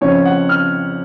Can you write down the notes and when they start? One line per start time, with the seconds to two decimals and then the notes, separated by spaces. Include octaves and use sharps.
0.01 F2 C#3 C#5
0.25 F#5
0.49 F6